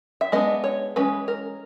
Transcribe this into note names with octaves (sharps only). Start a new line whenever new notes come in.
E5
G#3 B3 D4 D#5
C#5
E3 G#3 C#4 B4
A#4